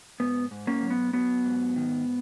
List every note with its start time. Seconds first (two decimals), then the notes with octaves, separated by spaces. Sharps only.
0.20 G#2 B3
0.51 G#2
0.67 A#3 C#4
0.82 F#3
0.90 B3
1.13 F#3 B3
1.46 G#2
1.76 D#3